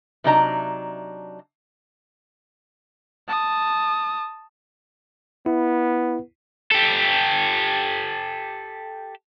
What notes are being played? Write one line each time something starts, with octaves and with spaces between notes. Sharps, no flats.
C3 F#3 D4 D#4 G#5 A#5
A5 D#6
B3 E4
G4 A4